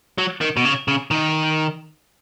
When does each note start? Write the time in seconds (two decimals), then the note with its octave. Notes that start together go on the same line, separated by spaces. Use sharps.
0.18 F#3
0.41 D#3
0.57 B2
0.65 C#3
0.88 C#3
1.11 D#3